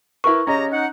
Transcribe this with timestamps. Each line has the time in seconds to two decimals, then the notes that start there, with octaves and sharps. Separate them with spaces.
0.24 E4 A#4 B4 C#6
0.47 C#3 C#4 G4 D#5 A#5
0.72 D#4 F#5